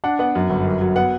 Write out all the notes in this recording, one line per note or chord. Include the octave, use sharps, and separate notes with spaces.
D4 F#5
B3 F#5
F#2
G1
F#2
F#3
B3 F#5